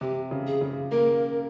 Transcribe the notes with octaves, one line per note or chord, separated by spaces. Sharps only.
C3 G4
C#3
G#4
C#3
A#3 A#4